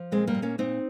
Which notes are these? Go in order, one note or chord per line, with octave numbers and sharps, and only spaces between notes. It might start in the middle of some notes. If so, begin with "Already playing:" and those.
Already playing: F3
A#2 G#3 C4
G3 A#3
A#2
A#3 C#4
A#2 C4 D#4